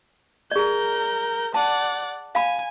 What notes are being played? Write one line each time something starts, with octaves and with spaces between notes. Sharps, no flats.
G#4 A#4 D5 G6
D5 F#5 A5
F5 G#5 B5